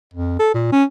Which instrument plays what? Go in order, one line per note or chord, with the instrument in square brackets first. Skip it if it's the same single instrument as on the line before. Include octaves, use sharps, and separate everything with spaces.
[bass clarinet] F2
A4
A#2
C#4